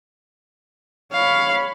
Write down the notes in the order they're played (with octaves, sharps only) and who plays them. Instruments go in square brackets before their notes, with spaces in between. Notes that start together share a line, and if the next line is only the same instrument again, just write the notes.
[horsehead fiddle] C#5 B5 [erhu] F5